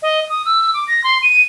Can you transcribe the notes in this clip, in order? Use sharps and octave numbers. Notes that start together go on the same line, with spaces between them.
D#5
D#6
E6
D6
A#6
C6
D#7